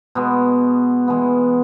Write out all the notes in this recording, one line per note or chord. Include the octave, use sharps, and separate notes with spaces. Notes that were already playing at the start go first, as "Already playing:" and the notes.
B2 G#3 B3
E3 G#3 B3